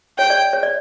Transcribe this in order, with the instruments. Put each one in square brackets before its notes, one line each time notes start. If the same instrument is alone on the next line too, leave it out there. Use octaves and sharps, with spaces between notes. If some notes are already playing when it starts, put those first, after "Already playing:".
[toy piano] C#5 [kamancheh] G5
[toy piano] D5
C#5
D5